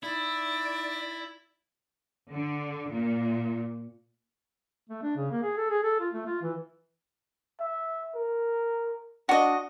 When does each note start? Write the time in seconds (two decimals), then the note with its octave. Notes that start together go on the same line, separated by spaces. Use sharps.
0.03 D#4 E4 D5
2.31 D3
2.91 A#2
4.90 A3
5.03 D4
5.16 C#3
5.31 A#3
5.43 G#4
5.57 A4
5.70 G#4
5.84 A4
6.00 F4
6.13 A3
6.26 F4
6.42 E3
7.60 E5
8.15 A#4
9.29 D4 F#4 D#5